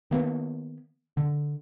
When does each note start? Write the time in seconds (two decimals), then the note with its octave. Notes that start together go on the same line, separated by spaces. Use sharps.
0.11 D#3 A#3 B3
1.17 D3